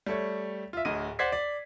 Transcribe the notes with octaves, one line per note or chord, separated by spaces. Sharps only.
G3 A3 C#5
F4 E5
D1 D2 D#5 D#7
C5 D5 F#5 G#6 B6 C7
D5